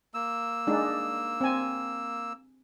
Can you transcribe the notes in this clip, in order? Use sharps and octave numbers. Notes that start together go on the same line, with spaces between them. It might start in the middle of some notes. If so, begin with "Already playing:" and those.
A#3 E6
G#3 D4 D#4
C4 G#5